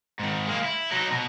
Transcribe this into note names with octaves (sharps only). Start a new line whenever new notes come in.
G#2 D#3
G#3 A#3
E4
F#3 D#4
B2